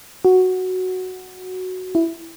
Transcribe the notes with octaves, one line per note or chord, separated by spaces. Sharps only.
F#4
E4